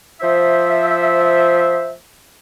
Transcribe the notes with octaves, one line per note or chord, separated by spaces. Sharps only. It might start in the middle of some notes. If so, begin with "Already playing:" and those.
F3 C5 E5